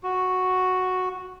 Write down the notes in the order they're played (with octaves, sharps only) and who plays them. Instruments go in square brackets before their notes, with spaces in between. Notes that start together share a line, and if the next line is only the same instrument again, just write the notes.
[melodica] F#4